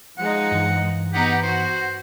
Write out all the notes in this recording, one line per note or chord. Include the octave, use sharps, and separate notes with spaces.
F3 G#3 D#4 F#5
G2 E3
B3 D#4 G4 F#5
F#4 C5